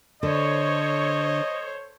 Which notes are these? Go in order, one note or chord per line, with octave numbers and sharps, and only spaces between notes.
D3 A4 C5 C#5 D#5